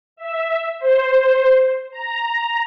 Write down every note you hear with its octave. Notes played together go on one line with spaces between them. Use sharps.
E5
C5
A#5